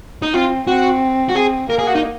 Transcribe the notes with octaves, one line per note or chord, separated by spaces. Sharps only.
D#4
C4 F4
C4 F#4
F#4
C4 G#4
A#3 A#4
G#4
F#4
D#4